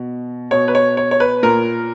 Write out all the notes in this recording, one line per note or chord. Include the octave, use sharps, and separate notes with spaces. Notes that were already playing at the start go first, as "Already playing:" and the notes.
Already playing: B2
B2 C#5
B4
C#5
C#5
C#5
B4
A#2 A#4